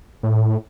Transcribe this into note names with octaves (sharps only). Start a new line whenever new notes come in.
A2